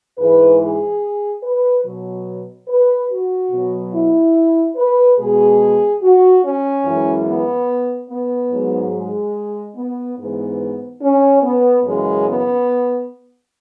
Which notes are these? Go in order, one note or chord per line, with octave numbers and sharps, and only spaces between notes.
G#2 E3 G#3 B4
G#4
B4
B2 F#3
B4
F#4
B2 F#3
E4
B4
B2 G#3 G#4
F#4
C#4
F#2 E3 G#3
B3
B3
G#2 F#3
G#3
B3
G#2 E3 G#3 B3
C#4
B3
F#2 C#3 E3 G#3
B3